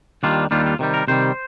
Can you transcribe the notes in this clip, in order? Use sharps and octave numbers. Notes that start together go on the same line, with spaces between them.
D#2 D#3 G3 D4 F4
D#2 D#3 G3 D4 F4
F4
C3 D#3 G3
A#4
C3 D#3 G3 C5